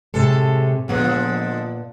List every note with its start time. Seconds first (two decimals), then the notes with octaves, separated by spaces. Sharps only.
0.14 A2 C3 G#3 A4
0.88 A#2 D3 F3 G#3 B3